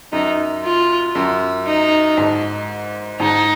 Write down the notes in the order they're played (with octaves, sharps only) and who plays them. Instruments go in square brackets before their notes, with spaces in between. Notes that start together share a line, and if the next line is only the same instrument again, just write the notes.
[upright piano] F#2 [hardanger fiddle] D#4
[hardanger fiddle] F4
[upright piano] F#2
[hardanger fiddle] D#4
[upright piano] G#2
[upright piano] G#2 [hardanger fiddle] D#4